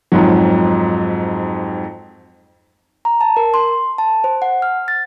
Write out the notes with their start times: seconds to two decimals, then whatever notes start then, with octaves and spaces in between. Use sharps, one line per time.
0.12 F2 G#2 F#3
3.05 A#5
3.21 A5
3.37 A#4
3.54 C6
3.98 A5
4.24 C5
4.42 F#5
4.62 F6
4.88 A6